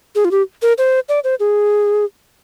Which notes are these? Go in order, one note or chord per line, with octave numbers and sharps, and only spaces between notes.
G#4
F4
G4
A#4
C5
D5
C5
G#4